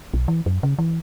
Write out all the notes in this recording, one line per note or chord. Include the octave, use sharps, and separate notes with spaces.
B1
E3
F#2
C#3
E3